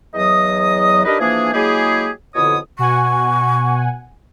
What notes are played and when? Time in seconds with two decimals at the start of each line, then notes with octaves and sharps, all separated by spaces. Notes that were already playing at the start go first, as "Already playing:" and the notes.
0.14 E2 F#3 D#5 D#6
1.05 D4 D#4 G4 A#4 B4 D#5
1.20 E3 F3 A#3 D4 G#4
1.53 F#3 G#3 A#3 E4 G4 G#4
2.35 F2 B2 D3 E4 C#5 D#6
2.79 B2 F#5 G#5 C#6